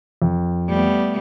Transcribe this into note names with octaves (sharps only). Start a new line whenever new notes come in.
F2
G3 A3 B3